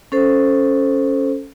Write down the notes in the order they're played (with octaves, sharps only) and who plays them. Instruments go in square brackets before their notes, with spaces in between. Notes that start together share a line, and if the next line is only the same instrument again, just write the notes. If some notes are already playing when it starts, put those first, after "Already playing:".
[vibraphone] C#4 A4 C5